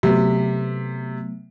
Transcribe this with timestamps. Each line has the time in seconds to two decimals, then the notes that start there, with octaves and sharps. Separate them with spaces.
0.03 C3 F#3 A3 B3